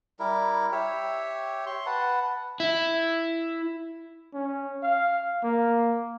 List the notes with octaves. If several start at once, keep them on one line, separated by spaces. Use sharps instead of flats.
G3 E4 A#4
G4 C#5 E5
C6 C#6
B4 F#5 A5
E4
C#4
F5
A#3